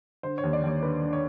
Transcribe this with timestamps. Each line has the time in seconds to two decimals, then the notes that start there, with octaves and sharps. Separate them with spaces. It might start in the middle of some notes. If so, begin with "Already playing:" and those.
0.23 D3 C5
0.38 C#5
0.43 D#2
0.53 D5
0.64 D#2 C#5
0.82 D3 B4
1.03 D3
1.13 C#5